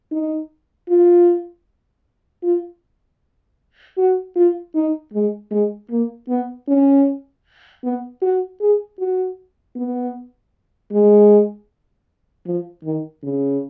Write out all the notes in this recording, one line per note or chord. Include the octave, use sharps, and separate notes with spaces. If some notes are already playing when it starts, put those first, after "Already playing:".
D#4
F4
F4
F#4
F4
D#4
G#3
G#3
A#3
B3
C#4
B3
F#4
G#4
F#4
B3
G#3
F3
D#3
C#3